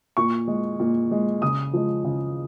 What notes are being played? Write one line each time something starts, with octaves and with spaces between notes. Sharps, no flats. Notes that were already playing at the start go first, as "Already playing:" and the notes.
A#2 C#6
G#3
A#2
G#3
C#3 D#6
F3 G#3
C#3